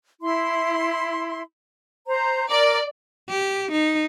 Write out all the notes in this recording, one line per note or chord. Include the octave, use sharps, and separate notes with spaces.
E4 C6
C5 A#5
A#4 D5
G4
D#4